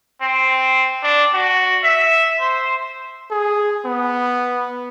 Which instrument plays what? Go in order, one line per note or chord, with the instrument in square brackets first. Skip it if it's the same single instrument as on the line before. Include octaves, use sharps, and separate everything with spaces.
[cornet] C4
D4
F#4
E5
C5
G#4
B3